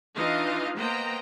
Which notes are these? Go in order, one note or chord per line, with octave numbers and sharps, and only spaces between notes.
E3 D4 D#4 F4 D#5 F5
A#3 B3 C5 D#5 G5 A#5